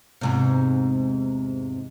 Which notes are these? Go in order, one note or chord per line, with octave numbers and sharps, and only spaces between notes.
E2 G#2 C3